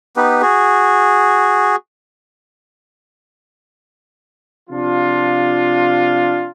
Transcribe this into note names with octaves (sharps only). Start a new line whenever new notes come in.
B3 D#4 G4 B4
F#4 G#4
C3 F3 D4 F4